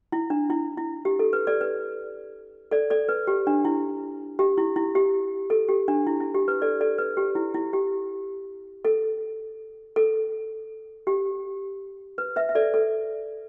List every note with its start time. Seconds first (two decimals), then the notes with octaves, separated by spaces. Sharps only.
0.12 E4
0.30 D4
0.50 E4
0.77 E4
1.05 G4
1.19 A4
1.33 B4
1.47 A4 D5
1.61 B4
2.71 A4 D5
2.90 A4 D5
3.09 B4
3.27 G4
3.47 D4
3.65 E4
4.39 G4
4.58 E4
4.76 E4
4.95 G4
5.50 A4
5.69 G4
5.88 D4
6.07 E4
6.20 E4
6.34 G4
6.48 B4
6.62 A4 D5
6.81 A4 D5
6.98 B4
7.17 G4
7.35 E4
7.54 E4
7.73 G4
8.85 A4
9.96 A4
11.07 G4
12.18 B4
12.36 B4 E5
12.49 E5
12.55 A4 D5
12.74 A4